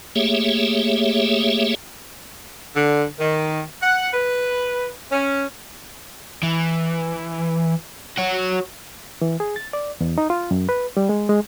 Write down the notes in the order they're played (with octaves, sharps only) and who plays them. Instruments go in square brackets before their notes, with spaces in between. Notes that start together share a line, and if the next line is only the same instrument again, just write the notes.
[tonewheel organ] A3 A#3 G4 G#4 C#5 E5
[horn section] D3
D#3
F#5
B4
C#4
[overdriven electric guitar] E3
F#4 C#5
[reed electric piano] E3
G#4
A6
D5
E2
D#4
F4
F#2
B4
G3
G#3
G#3